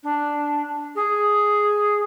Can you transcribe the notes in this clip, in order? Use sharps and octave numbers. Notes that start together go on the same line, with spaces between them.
D4
G#4